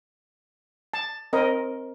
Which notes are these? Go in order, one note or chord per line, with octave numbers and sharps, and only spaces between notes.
A5
C4 A#4 D#5